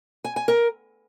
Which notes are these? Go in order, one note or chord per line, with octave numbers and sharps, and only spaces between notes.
G#5
G#5
A#4